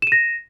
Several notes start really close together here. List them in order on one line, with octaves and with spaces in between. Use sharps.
E7 D#7 A#6